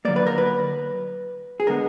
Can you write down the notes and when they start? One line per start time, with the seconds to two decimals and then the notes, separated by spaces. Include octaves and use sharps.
0.05 D3 F#3 A#3 D5
0.16 B4
0.27 A#4
0.38 B4
1.60 G#4
1.67 D3 G#3 B3 A#4